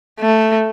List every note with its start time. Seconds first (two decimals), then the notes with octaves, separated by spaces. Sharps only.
0.20 A3